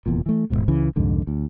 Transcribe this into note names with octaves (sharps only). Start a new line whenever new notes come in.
F1 E2 A#2
E3 A3
D#1 C#2 G#2 B2
C#2 C#3 E3
C2 F2 G#2 D3
D2